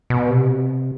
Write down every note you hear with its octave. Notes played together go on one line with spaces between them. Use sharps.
B2
C3